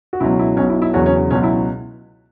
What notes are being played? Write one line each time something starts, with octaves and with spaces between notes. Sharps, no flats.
F#4
C#2 B2 F#3 E4
E4
B1 B2 F#3 C#4
E4
E4
E1 E2 C#3 F#3 C#4 F#4
C#4
C#2 B2 F#3 C#4
E4